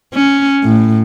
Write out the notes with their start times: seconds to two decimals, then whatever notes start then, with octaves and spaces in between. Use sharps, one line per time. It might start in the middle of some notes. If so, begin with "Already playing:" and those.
0.14 C#4
0.64 A2